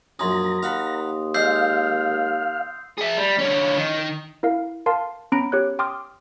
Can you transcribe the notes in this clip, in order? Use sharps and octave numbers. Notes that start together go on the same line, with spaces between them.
A#1 F#2 C#4 A#5 C6 D#6
D#2 F5 F#5 B5
G#3 D5 F5 E6 G6 C7
G#4 E5
G3
D3 C#4
D#3
E4 A#4 F5
A#4 F5 A5 C6
B3 C#4 A#5 B5 A#6 D7
G4 C#5 F#6
G5 C6 D6 D#6 F6